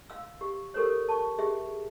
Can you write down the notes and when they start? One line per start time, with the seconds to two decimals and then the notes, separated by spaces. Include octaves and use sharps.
0.10 F5 E6
0.41 G4
0.74 G4 A4 A#4 C5 C#5
1.09 A5 C#6
1.39 G4 G#4 E5